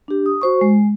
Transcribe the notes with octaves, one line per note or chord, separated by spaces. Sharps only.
D4 G4
D#6
F#4 C5 C#6
G#3